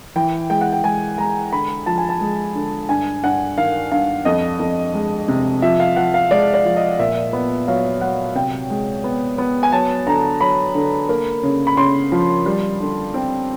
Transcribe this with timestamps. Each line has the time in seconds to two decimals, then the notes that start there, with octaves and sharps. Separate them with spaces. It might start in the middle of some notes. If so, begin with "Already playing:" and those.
0.16 E3 G5
0.50 G#3 G5
0.61 F#5
0.72 G5
0.84 G#3 G#5
1.18 G#3 A#5
1.52 D3 B5
1.86 F3 A5
1.98 G#5
2.09 A5
2.21 G#3
2.55 D3
2.89 G2 G#5
3.23 G2 F#5
3.58 D#3 F5
3.91 G2 F5
4.25 F2 D#5
4.60 F2
4.94 G#3
5.28 C3
5.62 F3 E5
5.80 F5
5.96 F3 F#5
6.14 F5
6.31 G#3 D5
6.54 D5
6.65 F3
6.77 D#5
6.99 A#2 E5
7.33 B3
7.68 F#3 F5
8.01 F#3 F#5
8.35 C3 G5
8.70 G#3
9.04 B3
9.38 B3
9.63 G#5
9.72 F#3 A5
10.07 D3 A#5
10.41 F#3 B5
10.75 D3
11.09 A#3
11.43 C#3
11.67 B5
11.77 C#3 C6
12.12 F3
12.46 G3
12.80 D3
13.14 C4